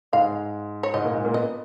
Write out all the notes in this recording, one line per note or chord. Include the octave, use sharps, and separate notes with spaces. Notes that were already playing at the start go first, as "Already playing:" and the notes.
G#2 G#3 F5
C#5
G#2 G#3 D#5
A#2 A#3
G#2 G#3
A#2 A#3
B3 D#5